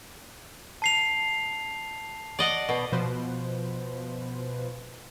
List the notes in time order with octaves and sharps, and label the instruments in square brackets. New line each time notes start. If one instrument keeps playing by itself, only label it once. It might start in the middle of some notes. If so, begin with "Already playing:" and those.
[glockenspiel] A5 C7 F7
[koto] D5 D#5 F#5
B2
[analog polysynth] B2 F3 B4 C5